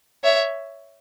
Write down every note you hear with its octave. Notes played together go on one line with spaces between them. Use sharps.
C#5 E5